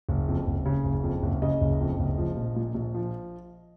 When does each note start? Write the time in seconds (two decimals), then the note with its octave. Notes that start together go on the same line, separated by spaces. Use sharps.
0.09 F#1
0.28 F2
0.47 F#1
0.65 C#3
0.84 F#1
1.04 F2
1.23 F#1
1.42 C#3 D#5
1.61 F#1
1.81 F2
1.99 F#1
2.18 F3
2.37 A#1
2.56 A#2
2.74 A#1
2.94 F3